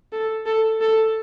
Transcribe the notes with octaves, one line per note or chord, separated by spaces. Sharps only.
A4
A4
A4